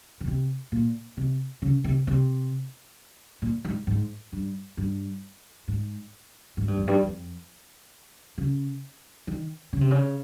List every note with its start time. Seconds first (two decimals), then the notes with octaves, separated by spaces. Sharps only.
0.21 C#3
0.27 C3
0.72 A#2
1.17 C3
1.62 C#3
1.84 C3
2.07 C3
3.42 A#2
3.65 G#2
3.87 G#2
4.32 G2
4.77 G2
5.68 G#2
6.57 G#2
6.68 G2
6.77 F2
6.87 G2
7.03 F2
8.38 C#3
9.27 D#3
9.73 C#3
9.81 C3
9.91 C#3